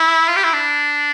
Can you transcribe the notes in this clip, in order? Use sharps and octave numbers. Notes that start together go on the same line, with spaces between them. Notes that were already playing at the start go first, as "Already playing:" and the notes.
Already playing: E4
F4
G4
E4
D4